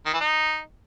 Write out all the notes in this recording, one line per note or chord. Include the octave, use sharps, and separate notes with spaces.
D#3
E3
D#4